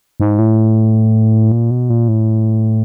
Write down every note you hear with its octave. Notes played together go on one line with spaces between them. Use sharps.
G#2
A2
A#2
B2
A#2
A2